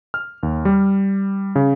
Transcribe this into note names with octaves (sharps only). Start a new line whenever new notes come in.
F6
D#2
G3
C#3